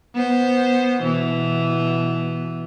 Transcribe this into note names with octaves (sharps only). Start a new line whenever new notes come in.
B3 C5
B2 E3